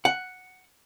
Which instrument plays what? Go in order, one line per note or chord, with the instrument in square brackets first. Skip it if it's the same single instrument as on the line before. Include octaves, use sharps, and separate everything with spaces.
[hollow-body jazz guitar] F#5